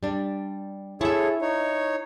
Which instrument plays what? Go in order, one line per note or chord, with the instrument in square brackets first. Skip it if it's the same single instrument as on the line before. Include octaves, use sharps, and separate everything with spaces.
[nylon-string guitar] G3 D4
[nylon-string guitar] E4 E5 [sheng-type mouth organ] G#4 A4 C#5
[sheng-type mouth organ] D#4 C#5